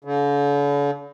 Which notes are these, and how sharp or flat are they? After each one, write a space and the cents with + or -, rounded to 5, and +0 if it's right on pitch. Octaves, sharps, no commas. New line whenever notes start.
D3 -45